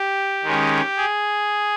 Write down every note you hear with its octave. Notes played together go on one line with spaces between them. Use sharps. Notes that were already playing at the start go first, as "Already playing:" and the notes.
Already playing: G4
D#3 G#3 C#4
G#4